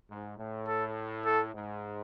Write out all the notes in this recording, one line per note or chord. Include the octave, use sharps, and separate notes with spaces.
G#2
A2
A4
A4
G#2